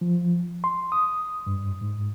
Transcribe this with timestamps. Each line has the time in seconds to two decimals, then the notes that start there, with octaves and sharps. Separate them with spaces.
0.01 F3
0.64 C6
0.92 D#6
1.47 G2
1.81 G#2